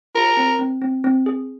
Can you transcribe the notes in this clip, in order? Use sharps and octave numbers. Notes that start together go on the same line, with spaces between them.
F4 A#4
C4
C4
C4
C4
G#4